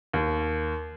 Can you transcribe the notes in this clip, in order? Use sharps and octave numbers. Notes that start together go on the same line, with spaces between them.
D#2